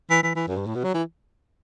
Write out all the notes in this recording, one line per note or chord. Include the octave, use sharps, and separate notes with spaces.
E3
E3
E3
F#2
G2
A2
B2
F#3
E3